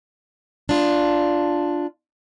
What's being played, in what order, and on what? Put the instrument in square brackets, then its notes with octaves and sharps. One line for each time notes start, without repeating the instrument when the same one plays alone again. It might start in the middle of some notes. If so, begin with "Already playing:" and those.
[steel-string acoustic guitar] D4 F4